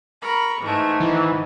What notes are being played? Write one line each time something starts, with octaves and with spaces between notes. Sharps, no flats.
A#4 B5 C#6
G#2 E3 G#3 A3
D#3 E3